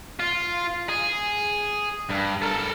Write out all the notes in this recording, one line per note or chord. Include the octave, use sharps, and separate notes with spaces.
F4
G#4
G2
A4 A#4